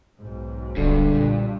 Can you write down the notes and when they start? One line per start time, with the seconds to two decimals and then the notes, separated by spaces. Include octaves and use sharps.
0.19 B1 G#2
0.76 D1 G2 D3
1.14 A#2